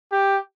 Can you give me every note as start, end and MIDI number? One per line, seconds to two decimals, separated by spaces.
0.12 0.37 67